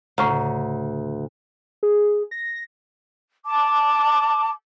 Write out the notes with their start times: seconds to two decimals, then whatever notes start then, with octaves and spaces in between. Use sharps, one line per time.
0.18 D2 A2 C#3 A#5
1.83 G#4
2.31 A#6
3.45 A5 D6